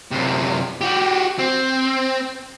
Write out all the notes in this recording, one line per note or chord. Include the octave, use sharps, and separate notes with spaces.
F#2 C3
F#4 G4
C4